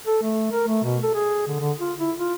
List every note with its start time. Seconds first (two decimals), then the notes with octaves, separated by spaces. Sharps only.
0.07 A4
0.22 A3
0.52 A#4
0.67 A3
0.83 B2
1.03 A4
1.14 G#4
1.48 D3
1.60 D3
1.79 F4
1.99 E4
2.17 F4